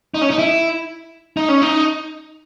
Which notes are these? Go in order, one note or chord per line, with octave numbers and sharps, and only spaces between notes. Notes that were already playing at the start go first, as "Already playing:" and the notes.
D#4
C#4
D#4
E4
D#4
C#4
D#4